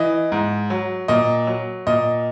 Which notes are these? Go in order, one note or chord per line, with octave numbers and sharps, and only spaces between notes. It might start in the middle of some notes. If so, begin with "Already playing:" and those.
Already playing: E3 D#5
G#2
F#3
A#2 D#5
F#3
A#2 D#5